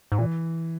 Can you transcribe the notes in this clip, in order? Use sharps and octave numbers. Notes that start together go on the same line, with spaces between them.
G#2
A#2 E3